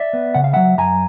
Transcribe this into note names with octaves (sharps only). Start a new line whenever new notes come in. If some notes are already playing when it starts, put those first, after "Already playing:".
Already playing: D5 E5
B3
C#3 F#5
F5
F#3 E5 F#5
F#2 G#5 A#5